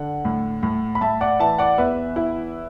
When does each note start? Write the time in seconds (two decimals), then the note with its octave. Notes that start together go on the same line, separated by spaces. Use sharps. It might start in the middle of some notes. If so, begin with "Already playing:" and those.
Already playing: D3 F#5
0.25 A2
0.63 A2
0.95 B5
1.01 A2 E5 A5
1.21 D5 F#5
1.40 E3 E5 A5
1.58 D5 F#5
1.78 E2 B4 E5
2.16 E4